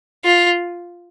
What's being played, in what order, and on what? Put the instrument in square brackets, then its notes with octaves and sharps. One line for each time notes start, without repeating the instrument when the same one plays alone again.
[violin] F4